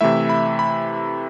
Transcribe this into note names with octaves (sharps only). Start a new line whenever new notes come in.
C3 E3 A3 E4 E5
B5
B5